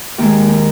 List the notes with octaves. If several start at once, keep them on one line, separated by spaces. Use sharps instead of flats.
D#2 D#3 G#3